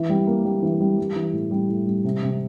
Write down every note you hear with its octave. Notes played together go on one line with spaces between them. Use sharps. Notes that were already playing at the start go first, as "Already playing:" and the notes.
Already playing: E3
G3
A#3
G3
E3
G3
G3
E3
A2
G3
A2
G3
C3
C3